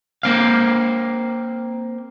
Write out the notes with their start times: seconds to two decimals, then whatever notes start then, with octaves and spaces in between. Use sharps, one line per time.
0.23 A#3 C4 F5